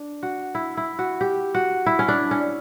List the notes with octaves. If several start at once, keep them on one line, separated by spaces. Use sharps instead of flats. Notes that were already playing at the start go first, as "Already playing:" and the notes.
Already playing: D4
F#4
E4
E4
F#4
G4
F#4
E4
C#4
D4
C#4